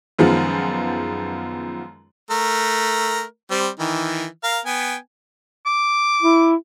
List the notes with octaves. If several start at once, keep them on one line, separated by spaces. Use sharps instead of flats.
F#2 D#3 F3 G#3 B3 F4
A3 A#4
G3 C4
D#3 E3
A#4 F5
B3 G5 G#5
D6
E4